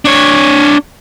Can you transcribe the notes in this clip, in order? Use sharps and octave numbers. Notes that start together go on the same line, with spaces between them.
D4 C#5